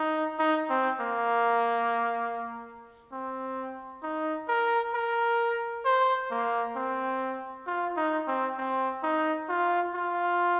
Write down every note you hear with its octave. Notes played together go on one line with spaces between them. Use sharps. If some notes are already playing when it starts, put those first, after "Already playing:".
Already playing: D#4
D#4
C4
A#3
C4
D#4
A#4
A#4
C5
A#3
C4
F4
D#4
C4
C4
D#4
F4
F4